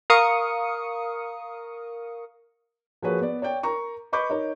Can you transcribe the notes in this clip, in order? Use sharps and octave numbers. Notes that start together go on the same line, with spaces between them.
A#4 F5 C#6 D#6 C#7
F3 A#3 F#4 G#4 B4 C#5
B3 D5
C#5 D5 G5
A#4 A#5 C#6
B4 D#5 B5 C#6 D6 G6
D#4 A#4 C#5